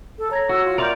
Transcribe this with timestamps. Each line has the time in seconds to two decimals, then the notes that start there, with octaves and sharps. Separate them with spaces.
0.19 A4
0.31 C#5 A#5 G#6 A#6
0.49 F#4 E6
0.65 F4
0.78 A#4 D5 E5 F5 C6 G6